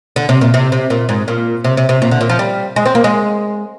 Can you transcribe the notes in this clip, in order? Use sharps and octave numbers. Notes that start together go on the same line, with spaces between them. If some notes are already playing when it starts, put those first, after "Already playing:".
D3
C3
A#2
C3
C3
A#2
G#2
A#2
C3
C3
C3
A#2
D3
A#2
F3
G3
G#3
C4
A#3
G#3